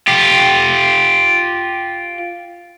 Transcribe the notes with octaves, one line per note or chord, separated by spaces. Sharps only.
F4 G4